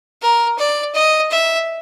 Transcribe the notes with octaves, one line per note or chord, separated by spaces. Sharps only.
A#4
D5
D#5
E5